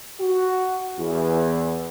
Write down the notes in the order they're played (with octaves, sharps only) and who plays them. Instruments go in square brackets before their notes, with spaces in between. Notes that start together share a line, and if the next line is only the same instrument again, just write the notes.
[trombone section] F#4
E2